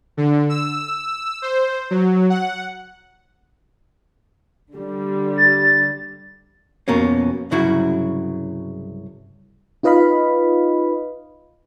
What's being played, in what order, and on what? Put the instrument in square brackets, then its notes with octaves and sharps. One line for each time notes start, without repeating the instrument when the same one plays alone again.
[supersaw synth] D3
E6
C5
F#3
F#5
[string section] D3 G3
[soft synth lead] A6
[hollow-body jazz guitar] F2 B2 A#3 C#4
C2 G2 C#3 F#3 E4 F#4
[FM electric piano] D#4 F4 B4 D#5 F5 B5